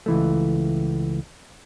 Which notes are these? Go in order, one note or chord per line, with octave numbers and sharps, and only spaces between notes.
C#2 E3 A3